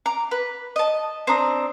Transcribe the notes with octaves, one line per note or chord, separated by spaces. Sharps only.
A#5 D6
B4
D#5 A5
C4 D4 A#5 D#6